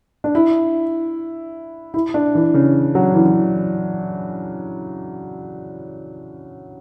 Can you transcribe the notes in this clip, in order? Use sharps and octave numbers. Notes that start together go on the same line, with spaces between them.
D4
E4
E4
D4
E3
C#3
F#3
E3
E3